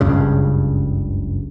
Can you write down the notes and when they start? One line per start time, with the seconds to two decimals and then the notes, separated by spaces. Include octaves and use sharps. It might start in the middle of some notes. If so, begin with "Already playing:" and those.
0.01 F#1 C#2 G2 C#3